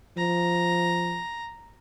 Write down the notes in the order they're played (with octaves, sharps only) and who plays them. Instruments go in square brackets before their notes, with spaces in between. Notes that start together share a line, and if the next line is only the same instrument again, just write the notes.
[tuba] F3 [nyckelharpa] A#5